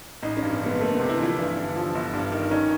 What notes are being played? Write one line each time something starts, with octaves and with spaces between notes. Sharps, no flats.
A1 D#4
C#4
G2
C4
D3 B3
A3 A#3
C3 B3
E4
E3
F4
G2 E4
D3
F3
G1
G2
D#3
C#4 D#4